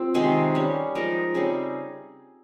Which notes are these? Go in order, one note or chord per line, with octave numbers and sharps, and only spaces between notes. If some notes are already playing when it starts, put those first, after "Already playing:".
Already playing: C4 F4
C3 D#3 G#3 G#4
G3 C#4
F3 G#3 D#4 A#4
C#3 G3 C4 D#4 G#4